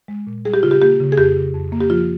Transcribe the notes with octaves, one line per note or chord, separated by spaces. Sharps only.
G#3
A#2
G3 G#4
G4
C#3 F4
G4
A#3 G4
C#3
G#4
F2 G4
C#3
F2
A#3
G4
F3 F4